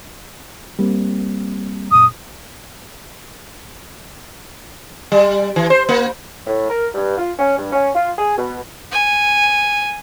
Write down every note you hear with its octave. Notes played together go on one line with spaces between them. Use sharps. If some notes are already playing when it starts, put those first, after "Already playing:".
G3 A#3 C4
F#2 A#2 D#6
G3
E3
C5
A#3
A2
A#4
G2
F4
C#4
G2
C#4
F4
G#4
B2
G#5